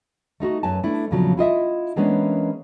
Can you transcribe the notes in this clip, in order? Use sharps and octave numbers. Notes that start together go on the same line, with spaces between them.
A3 D#4 F4 F#4
F#2 B4 G#5 A5
A3 D4 E4
E2 A#2 C#3 F3 F#3
E4 F4 D#5 E5
E3 G#3 A#3 B3 C#4 D4